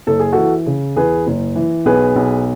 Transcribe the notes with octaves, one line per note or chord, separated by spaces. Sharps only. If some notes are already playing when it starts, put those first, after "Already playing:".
F#1 A4
G#4
E3 F#4 A4
C#3
E2 G#4 B4
F#1
E3
B1 G#4 B4
B1